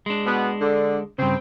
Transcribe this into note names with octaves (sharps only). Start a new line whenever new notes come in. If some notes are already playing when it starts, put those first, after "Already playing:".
G#3 D4
B2 B3
D3
G2 C#3 C4